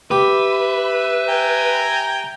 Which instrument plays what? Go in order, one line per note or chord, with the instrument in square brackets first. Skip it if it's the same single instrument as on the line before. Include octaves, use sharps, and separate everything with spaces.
[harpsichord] G4 [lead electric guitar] B4 [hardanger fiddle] E5
[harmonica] G5 G#5 A#5